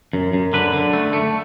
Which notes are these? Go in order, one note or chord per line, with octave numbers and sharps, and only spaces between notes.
F#2
F#2
D3 B4
D3
A3
A3